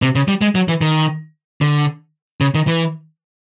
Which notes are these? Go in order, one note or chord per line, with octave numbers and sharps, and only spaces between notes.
C3
C#3
G3
G#3
F#3
E3
D#3
D3
C#3
D#3
E3